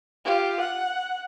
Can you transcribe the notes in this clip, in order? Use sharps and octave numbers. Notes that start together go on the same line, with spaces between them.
F4 G4
F#5